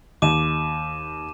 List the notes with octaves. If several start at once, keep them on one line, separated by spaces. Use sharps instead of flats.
D#2 D6 D#7 E7